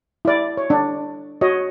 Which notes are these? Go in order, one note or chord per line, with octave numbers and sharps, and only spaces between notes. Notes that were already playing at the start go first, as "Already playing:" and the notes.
E4 D5
C#5
D4
F#4 C#5 D#5